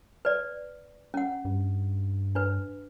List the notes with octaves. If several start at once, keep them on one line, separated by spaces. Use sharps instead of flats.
B4 D5
C#4 F#5
G2
D4 B4